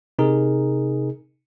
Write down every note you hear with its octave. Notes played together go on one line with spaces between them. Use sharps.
C3 D#4 G#4 A#4